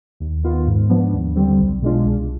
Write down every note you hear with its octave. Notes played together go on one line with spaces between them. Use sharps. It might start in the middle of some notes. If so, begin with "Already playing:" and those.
D#2
D#3 B3 F4
G#2
F3 B3 D4
D#2
D3 G3 C4
B1
B2 G#3 D4 F4
C2